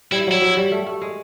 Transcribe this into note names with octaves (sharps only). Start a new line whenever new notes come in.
G3 E4
F#3 E4
F#3
G3
A3
A3
G#3